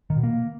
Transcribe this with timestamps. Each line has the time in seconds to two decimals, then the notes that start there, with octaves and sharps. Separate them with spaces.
0.10 D#3
0.17 B2
0.23 A#3